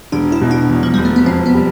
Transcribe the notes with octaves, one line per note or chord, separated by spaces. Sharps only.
E1 D4
E4
B2
D4
E2
F3
E1 G3
A3
B3
F2 C4
B3
G3